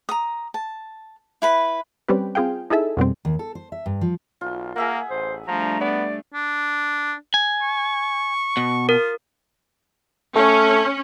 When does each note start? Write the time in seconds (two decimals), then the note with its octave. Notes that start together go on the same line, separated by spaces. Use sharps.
0.09 A#5 D#6
0.54 A5
1.42 E4 B4 B5
2.09 G3 C4 C#4 G4 B4
2.35 C4 F4 G#4 F5 G5
2.70 D#4 E4 G#4 A4 E5
2.97 F2 B2 G3 C4
3.25 D#2
3.39 A4
3.55 C5
3.72 E5
3.86 G2
4.01 F3
4.41 B1 F4
4.76 A#3 G#4 A#4 E5 F#5
5.10 A1 C5
5.48 F3 G3 A3 D4 A#5
5.81 B3 D5
6.34 D4
7.34 G#5
7.62 C#6
8.57 B2
8.89 F4 A#4
10.36 A3 C#4